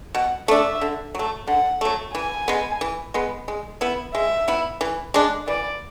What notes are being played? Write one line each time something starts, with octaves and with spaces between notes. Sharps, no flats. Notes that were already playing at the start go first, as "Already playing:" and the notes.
B2 F#5
A3 D4 E5
D3
F#3 A3
D3 F#5
F#3 A3
E3 G#5
G#3 B3
E3
G#3 B3
G#3
B3 E4
G#3 E5
B3 E4
E3
G#3 D4
E3 D5